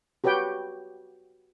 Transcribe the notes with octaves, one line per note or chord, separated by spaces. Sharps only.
F#4 G4 B4 C#5 G5